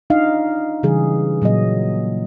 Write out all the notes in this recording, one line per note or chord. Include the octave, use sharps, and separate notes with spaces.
D4 D#4 D#5 F5
C#3 E3 G3 G#4
A#2 F#3 A#3 D#5